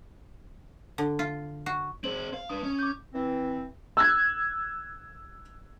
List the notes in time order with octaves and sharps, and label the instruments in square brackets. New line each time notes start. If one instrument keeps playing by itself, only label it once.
[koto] D3
F4
F#4
[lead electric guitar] C4 G#4 [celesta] C5 F#7
[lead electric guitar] F5
[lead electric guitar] D4 B4 [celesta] D#6
[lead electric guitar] C#4
[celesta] D6 G6
[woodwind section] E3 C4
[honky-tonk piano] E6 F#6 G#6